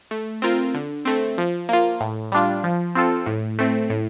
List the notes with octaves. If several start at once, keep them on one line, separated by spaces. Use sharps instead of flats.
A3
C4 F4 A#4
D3
A3 C4
F3
A#3 F4
A2
G3 D4 F4
F3
C4 F4 A4
A2
A3 C4
A2